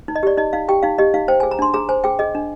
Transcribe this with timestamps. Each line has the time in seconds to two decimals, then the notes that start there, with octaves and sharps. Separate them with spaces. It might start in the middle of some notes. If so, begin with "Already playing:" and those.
0.08 D#4
0.15 D#5
0.23 G4 D5
0.37 D#4 D#5
0.53 D#4 F5
0.68 G4 G5
0.83 D#4 F5
0.98 G4 D#5
1.14 D#4 F5
1.28 C5 G5
1.40 G#5
1.43 G#4
1.51 A#5
1.59 D4 C6
1.74 G#4 A#5
1.89 C5 G#5
2.04 G#4 G5
2.19 G#4 D#5
2.35 D4